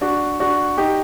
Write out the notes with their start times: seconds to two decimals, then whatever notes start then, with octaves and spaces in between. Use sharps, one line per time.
0.01 D4 F#4
0.40 D4 F#4
0.78 D#4 G4